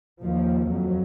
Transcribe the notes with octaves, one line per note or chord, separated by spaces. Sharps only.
D#2 F3
F2 F#3